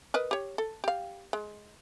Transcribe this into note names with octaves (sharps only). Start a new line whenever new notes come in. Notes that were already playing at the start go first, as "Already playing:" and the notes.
A#4 B4 D#5
G4 C#5
A4
G4 F5
G#3